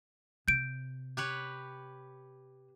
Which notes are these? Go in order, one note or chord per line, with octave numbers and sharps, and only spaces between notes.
C3 G6 D7
G4 B4 C#5